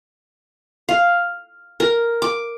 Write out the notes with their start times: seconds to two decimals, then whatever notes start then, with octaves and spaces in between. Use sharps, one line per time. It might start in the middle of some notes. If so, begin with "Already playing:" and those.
0.89 F5
1.80 A#4
2.22 D6